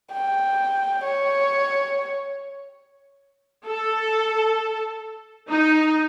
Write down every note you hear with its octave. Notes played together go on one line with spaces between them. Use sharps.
G5
C#5
A4
D#4